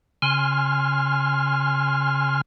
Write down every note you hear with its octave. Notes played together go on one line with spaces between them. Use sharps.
C#3 G#5 C6 F6